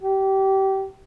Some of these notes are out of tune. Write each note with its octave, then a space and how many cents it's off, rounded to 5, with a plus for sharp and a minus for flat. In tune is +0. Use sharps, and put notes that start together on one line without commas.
G4 -25